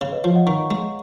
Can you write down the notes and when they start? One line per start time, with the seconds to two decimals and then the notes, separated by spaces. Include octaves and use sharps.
0.01 C#3 C#5
0.12 B4 D#5
0.24 F3 C#5 F5
0.35 D#5 F#5
0.46 D#3 A#5 C#6
0.71 G#3